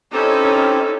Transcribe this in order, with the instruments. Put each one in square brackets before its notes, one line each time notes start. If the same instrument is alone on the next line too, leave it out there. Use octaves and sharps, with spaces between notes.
[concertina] C4 G4 [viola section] C#4 D#4 E4 [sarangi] A4